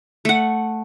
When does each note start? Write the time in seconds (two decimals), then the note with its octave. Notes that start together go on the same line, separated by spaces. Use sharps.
0.25 A3 F#5